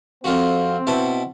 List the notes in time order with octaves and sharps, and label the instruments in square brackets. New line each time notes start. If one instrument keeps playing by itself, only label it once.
[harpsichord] F2 F4 F#4 [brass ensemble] C4
[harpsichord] B2 E4 A5